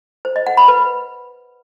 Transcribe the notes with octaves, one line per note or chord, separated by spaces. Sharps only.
C5
D#5
F#5
B5
B4